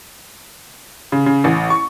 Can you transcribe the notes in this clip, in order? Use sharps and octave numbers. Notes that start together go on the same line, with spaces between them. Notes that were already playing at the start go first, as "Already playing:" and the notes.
C#3
C#3
A1
C#6